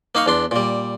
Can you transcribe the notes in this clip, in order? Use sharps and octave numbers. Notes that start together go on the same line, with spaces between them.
A#3 D#4 F5 C#6
E2 D4 C6
A#2 G3